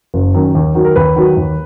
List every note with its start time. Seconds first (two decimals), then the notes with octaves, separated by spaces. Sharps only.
0.14 F#1
0.34 F#2 D#3
0.55 D#2
0.75 D#3 F#3
0.85 A#4
0.96 D#2 B4
1.16 D#3 F#3
1.37 D#2